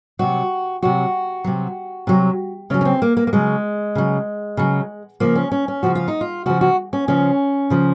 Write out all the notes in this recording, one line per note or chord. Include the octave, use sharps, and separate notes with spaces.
C3 F#3 F#4
C3 F#3 F#4
C3 F#3
C3 F#3
C#3 F#3 C#4
C#4
C4
A#3
A#3
A#3
C#3 F#3 G#3
C#3 F#3
C#3 F#3
C#3 F3 A#3
C#4
C#4
C#4
C#3 F3 F#4
F4
D#4
F4
C#3 F3 F#4
F#4
C#4
C#3 F3 C#4
C#3 F3